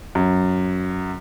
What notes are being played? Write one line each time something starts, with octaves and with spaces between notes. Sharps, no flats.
F#2